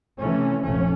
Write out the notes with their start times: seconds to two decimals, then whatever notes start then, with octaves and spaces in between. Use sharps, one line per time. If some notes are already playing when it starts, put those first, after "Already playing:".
0.19 C3 E3 A3 C#4
0.63 F1 A#1 A3 C#4